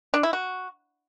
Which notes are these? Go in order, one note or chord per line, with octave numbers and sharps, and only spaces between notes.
D4
E4
F#4